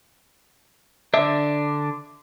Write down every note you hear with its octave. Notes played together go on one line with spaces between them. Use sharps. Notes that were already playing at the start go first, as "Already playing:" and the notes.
D3 D4 E5